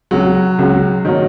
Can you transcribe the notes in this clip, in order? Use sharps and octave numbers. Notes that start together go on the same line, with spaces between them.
C#2 C#3 F#3 G#3 F#4
C#2 C#3 G#3 F#4
A#2 D#3 F#3 C#4 F#4